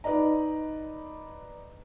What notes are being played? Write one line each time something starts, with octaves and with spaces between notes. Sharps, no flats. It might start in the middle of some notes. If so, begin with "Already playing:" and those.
D#4 B4 D5 D#5 A#5